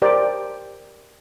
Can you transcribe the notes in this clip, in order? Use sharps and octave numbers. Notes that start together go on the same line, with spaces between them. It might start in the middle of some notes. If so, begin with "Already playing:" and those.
G4 A#4 C5 D5 G5